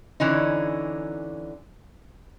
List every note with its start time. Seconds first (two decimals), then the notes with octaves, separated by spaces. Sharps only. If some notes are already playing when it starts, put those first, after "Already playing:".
0.20 D3 E3 C#4 D#4